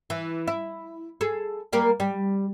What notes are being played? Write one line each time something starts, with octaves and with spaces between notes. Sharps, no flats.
E3
E4
G#4 A4
G3 A#3 A#4
G3